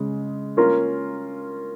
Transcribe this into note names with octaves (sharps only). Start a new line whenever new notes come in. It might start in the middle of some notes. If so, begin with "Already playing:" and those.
Already playing: C#3 G#3
A#3 C#4 F4 A#4